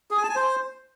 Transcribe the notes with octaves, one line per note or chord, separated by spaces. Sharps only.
G#4
G#5
A5
G#5
C5